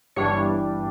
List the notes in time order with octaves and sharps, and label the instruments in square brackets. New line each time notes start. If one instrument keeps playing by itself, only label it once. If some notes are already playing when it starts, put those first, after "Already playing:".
[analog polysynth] G1 G2 E3 G3 D4 C#5